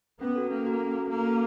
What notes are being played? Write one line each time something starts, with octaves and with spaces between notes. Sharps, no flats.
B3 C#4
F#4 A4
A#3 C#4
F#4 A4
C#4
F#4 A4
A#3 C#4
F#4 A4